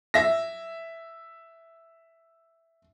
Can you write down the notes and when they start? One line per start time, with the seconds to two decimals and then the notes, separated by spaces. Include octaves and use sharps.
0.14 E5 A#6